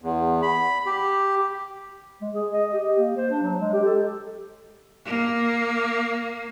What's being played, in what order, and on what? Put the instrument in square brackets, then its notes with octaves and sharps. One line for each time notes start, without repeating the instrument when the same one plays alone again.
[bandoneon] E2
B5
G4
[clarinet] G#3
G#4
D#5
G4
A#3
C5
D4
F#3
G#3
G4
A4
[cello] A#3